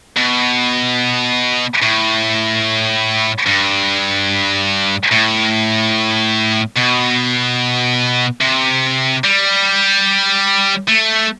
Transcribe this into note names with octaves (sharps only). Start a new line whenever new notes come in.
B2
A2
G2
A2
B2
C3
G3
A3